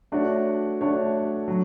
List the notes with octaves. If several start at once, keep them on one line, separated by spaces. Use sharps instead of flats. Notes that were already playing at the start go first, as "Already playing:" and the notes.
A3 D4 F#4 C#5
A3 D4 F#4 C#5
F#3